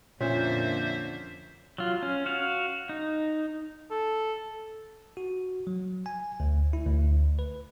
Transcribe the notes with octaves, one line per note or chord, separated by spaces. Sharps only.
F2 A#2 D3 C#4 C5 E5
F#3 F4
C#4
F#4 F5
D#4
A4
F#4
F#3
G#5
D2
E4
D2
B4